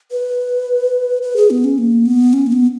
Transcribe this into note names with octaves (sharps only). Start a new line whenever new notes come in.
B4
B4
G#4
B3
C#4
A#3
B3
C#4
A#3
B3